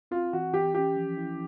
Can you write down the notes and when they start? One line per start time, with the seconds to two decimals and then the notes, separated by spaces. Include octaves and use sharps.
0.11 C4 F4
0.33 E3 F#4
0.53 E3 G4
0.74 C#4 G4
0.97 F3
1.18 E4